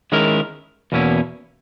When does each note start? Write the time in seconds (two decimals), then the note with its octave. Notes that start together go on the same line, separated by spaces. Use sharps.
0.12 D#3 G#3 C#4 E4 A#4
0.92 E2 B2 A#3 C#4 E4